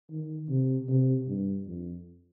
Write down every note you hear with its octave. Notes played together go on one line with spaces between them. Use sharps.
D#3
C3
C3
G2
F2